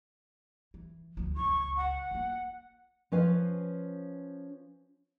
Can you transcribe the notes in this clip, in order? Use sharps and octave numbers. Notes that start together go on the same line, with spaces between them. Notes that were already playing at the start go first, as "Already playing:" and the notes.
E3
D2 F3
F#1 C#2 C#6
F#5
A#3 F4
F3 C#4 B4 F5